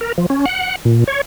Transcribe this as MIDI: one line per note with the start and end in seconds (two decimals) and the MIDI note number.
0.01 0.12 70
0.18 0.26 53
0.30 0.45 61
0.46 0.75 78
0.85 1.04 46
1.08 1.21 73